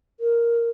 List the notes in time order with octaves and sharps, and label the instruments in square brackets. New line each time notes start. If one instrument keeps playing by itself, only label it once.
[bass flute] A#4